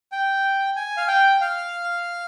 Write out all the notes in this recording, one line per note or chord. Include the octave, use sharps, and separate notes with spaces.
G5
G#5
F5
G5
F5